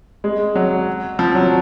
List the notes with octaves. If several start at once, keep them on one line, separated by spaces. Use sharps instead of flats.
G#3
F#3
F3
F#3